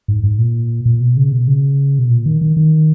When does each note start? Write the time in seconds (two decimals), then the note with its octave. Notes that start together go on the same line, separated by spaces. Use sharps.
0.08 G#2
0.24 G#2
0.39 A#2
0.86 A#2
1.01 B2
1.17 C#3
1.32 B2
1.48 C#3
1.99 B2
2.10 A#2
2.26 D#3
2.41 D#3
2.57 D#3